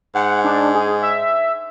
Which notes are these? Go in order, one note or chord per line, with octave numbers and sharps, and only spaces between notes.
G#2 F#5
D4
G#4
E5